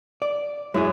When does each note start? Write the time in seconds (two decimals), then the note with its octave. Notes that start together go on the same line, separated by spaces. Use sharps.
0.22 D5
0.74 F#2 G#3 E4 G#4